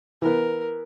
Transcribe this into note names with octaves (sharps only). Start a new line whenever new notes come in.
E3 B3 A#4